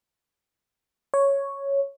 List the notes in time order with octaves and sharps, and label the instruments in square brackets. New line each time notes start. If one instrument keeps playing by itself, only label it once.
[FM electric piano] C#5